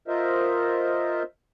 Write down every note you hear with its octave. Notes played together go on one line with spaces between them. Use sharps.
F4 A#4 C5 D#5 E5